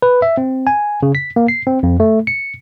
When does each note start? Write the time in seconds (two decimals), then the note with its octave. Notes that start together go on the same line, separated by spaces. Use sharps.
0.02 B4
0.22 E5
0.37 C4
0.67 G#5
1.03 C#3
1.15 B6
1.36 A#3
1.48 C7
1.67 C4
1.83 F2
2.00 A3
2.27 C#7